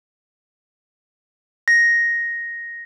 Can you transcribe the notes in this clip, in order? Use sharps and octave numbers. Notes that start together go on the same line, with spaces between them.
A#6